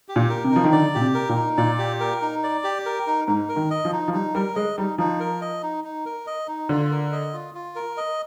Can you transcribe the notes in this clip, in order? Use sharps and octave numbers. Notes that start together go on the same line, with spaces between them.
G4
A#2
A#4
C3
D#4
F3
D#3
D3 D5
A#2 G4
C3
A#4
A#2
D#4
A#2 D5
G4
A#4
D#4
D5
G4
A#4
D#4
G#2 D#4
A#4
D#3
D#5
F3
D#4
F3
G3 D#4
G3 A#4
G#3 D#5
G3 D#4
F3 D#4
A#4
D#5
D#4
D#4
A#4
D#5
D#4
D3 F4
A#4
D#5
F4
F4
A#4
D#5